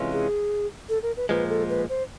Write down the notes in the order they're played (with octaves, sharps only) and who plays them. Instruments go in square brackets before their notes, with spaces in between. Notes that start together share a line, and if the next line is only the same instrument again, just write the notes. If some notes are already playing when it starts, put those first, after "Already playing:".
Already playing: [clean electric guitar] C3 E3 G#3 C#4 F4
[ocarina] G#4
A4
A#4
B4
[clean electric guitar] A#2 F3 G#3 [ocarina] B4
[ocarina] A4
B4
C5